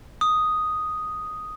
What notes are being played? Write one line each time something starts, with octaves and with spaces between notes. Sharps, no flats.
D#6